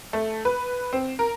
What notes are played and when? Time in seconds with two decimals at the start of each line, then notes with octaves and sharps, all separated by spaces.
0.13 A3
0.45 B4
0.93 C4
1.19 A#4